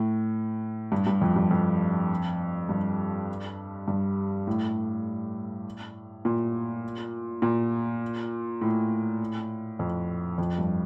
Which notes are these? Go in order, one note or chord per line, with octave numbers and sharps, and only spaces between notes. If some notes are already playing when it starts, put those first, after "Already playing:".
Already playing: A2
G2
G2
F2
G2
F2
G2
G2
A2
A#2
A#2
A2
F2
F2
G2